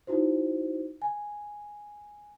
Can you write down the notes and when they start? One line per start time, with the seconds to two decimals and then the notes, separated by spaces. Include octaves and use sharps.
0.07 D#4 E4 F#4 C5
1.02 G#5